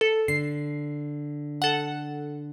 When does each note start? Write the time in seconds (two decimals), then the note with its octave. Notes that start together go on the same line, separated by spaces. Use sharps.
0.01 A4
0.28 D3 C7
1.62 A4 F#5